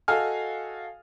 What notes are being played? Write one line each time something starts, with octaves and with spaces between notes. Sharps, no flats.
F#4 A4 D#5 F5 G#5 F6